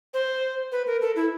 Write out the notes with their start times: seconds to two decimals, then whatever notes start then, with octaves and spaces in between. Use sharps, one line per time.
0.14 C5
0.72 B4
0.87 A#4
1.01 A4
1.16 E4